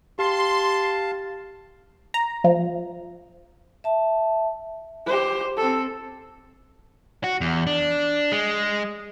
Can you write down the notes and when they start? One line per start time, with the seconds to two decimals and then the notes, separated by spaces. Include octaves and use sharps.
0.19 G4 F5 A5 C6
2.14 A#5
2.44 F3
3.84 E5 A5
5.06 G4 C5
5.57 C4 A4
7.24 F#4
7.41 E2
7.67 D4
8.32 G#3